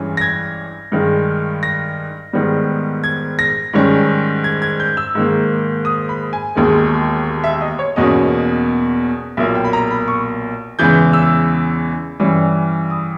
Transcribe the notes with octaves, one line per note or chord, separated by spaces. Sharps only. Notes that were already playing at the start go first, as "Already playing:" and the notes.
Already playing: G2 E3 G#3 C#4
A#6
G#6
G2 D#3 G#3
A#6
G#2 D#3 G3 B3
G#6
A#6
G#2 D#3 G3 C#4
G#6
G#6
G6
E6
G#2 D#3 A#3
D#6
B5
G#5
E1 D#2 D#3 G#3
E5
D#5
C#5
E2 B2 A#3 C#4 D#5
B1 A#2 A#3 E5
G5
B5
A#5
B5
C#6
E2 C#3 E3 G#3 G6
E6
G2 E3 G3 C#4
D#6